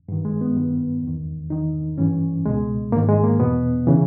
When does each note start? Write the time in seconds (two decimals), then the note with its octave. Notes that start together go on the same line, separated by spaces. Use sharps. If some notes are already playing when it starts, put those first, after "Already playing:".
0.08 G2 D#3
0.25 G#3
0.41 B3
0.57 G2 D#3
1.03 E2 D#3
1.50 E2 D#3 D#4
1.98 G2 E3 C#4
2.45 C#2 B2 G#3
2.92 G#2 D#3 A#3
3.08 G#3
3.23 A#3
3.40 E2 B2 B3
3.87 C#3 E3